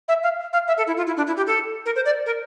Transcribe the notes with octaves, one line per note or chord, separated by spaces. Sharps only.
E5
F5
F5
E5
A4
E4
F4
E4
D4
E4
G4
A4
A#4
C5
D5
A#4